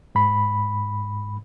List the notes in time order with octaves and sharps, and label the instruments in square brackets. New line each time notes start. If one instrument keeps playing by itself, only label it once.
[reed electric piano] G#2 B5